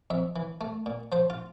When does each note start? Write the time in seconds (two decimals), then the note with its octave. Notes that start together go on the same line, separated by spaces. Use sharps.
0.10 F2 E5
0.36 E3
0.61 A3
0.86 A#2
1.12 F3 C5
1.30 F4